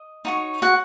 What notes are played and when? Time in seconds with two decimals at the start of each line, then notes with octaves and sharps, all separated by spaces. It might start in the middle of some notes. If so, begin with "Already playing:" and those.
Already playing: D#5
0.25 D#4 F#4 C#5
0.62 F#4 F#5